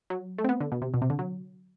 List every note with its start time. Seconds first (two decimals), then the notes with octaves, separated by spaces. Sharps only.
0.10 F#3
0.38 A3
0.44 C4
0.49 B3
0.61 D3
0.72 B2
0.82 C3
0.94 B2
1.02 C3
1.10 D3
1.19 F#3